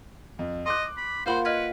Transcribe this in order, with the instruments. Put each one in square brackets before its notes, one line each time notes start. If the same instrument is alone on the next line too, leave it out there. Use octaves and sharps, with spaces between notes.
[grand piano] F2
[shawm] D#5 [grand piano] C6 D6 F#6
[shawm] B5
[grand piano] A#3 F4 F#5 [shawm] C5 [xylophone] F5 B5 C6
[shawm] B4 [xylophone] D#5 F6 G#6